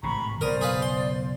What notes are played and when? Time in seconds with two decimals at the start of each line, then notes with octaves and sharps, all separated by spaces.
0.03 G#1 A2 C3 A#5 B5 C#6
0.41 F#1 B1 A#4 C5 D5 D#6
0.61 G#4 B4 F5
0.82 C6